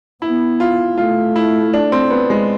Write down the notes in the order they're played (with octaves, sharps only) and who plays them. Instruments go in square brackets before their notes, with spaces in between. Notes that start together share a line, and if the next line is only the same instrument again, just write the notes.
[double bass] B3 [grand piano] E4
[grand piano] F4
[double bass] A3 [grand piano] F4
[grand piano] E4
D4
C4
B3
G#3